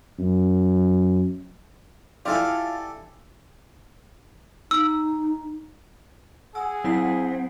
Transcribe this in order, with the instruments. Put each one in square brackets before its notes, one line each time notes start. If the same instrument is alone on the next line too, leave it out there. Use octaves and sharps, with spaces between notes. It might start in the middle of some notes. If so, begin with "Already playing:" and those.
[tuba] F#2
[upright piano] E4 D5 [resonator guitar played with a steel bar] F4 [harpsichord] G4 A4 G#5
[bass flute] D#4 [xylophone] E6
[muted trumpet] G#4 [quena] F#5 [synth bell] E6
[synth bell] F#3 E4 B6 [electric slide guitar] C4